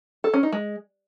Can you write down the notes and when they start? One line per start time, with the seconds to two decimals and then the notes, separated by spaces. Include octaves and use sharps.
0.24 A4
0.34 C#4
0.43 D#4
0.52 G#3